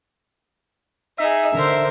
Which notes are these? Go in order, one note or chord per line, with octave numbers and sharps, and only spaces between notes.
D#4 G#4 E5
D3 A#4 C5